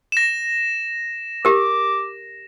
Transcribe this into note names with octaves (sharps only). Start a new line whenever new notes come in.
A#6 E7
G4 A#4 D6